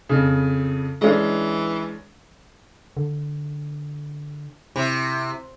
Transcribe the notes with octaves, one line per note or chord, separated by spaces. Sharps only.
F2 C#3
E3 G#3 C#4 D4
D3
C3 E4